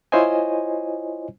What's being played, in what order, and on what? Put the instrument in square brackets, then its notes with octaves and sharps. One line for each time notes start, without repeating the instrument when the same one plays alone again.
[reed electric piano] E4 F4 C5 C#5 D#5 G#5